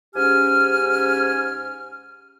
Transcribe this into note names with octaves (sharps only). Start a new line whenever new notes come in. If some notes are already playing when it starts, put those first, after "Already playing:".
G#2 C#4 G4 G#5 F6